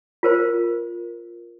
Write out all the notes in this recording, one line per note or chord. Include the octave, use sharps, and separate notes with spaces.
F4 A#4 C5